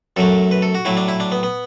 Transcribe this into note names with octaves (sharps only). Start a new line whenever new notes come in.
F#2 F#3 A3 A4
B4
A4
F#4
A2 F#3 A3 E4
D4
E4
D4
B3
B3